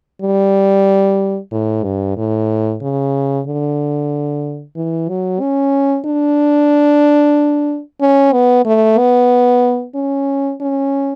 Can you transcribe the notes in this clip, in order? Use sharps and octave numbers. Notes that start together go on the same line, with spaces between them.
G3
A2
G2
A2
C#3
D3
E3
F#3
C#4
D4
C#4
B3
A3
B3
C#4
C#4